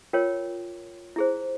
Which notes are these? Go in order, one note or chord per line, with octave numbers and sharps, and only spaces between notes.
F4 A#4 C#5 G5
E4 G#4 C5